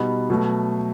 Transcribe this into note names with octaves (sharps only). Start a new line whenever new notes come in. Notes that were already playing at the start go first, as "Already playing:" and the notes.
Already playing: B2 G3 B3 D#4
B2 F#3 A3